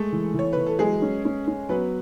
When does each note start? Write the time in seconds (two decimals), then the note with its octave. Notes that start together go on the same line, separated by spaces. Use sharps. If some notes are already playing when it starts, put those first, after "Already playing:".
Already playing: G#3 A3 A4
0.12 E3
0.34 E3
0.39 C#5
0.53 E3 B4
0.67 A4
0.79 F#3 G#3 G#4
1.02 C#4
1.25 C#4
1.48 C#4
1.69 F#3 B3 B4